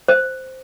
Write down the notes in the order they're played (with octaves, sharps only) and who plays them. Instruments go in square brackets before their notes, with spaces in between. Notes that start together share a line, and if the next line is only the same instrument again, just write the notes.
[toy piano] C5